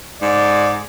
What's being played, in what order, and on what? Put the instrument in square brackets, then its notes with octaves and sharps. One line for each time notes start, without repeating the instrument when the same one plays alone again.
[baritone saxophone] G#2 [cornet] D5